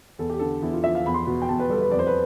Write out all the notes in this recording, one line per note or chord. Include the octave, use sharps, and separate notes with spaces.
E2 A4
G4
D3 A4
E2 E4
F4
F3 E5
F5
E2 B5
C6
B2 B5
G5
E2 A5
B4
G3 A4
B4
F2 D5
C5
B4